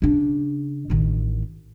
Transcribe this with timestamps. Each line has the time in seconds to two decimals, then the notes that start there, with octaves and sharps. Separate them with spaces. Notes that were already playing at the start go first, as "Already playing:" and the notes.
0.02 C#3 D4
0.90 A1 D#3